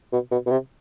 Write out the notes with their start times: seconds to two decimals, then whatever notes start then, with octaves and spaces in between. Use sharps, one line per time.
0.13 B2
0.31 B2
0.46 B2
0.51 C3